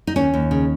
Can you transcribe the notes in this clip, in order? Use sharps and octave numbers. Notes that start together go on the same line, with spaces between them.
D#4
D#2 C#4
D#2
C#3